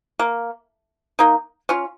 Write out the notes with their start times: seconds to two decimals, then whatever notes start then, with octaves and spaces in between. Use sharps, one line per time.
0.19 A#3
1.19 A#3 D#4
1.69 C#4 F4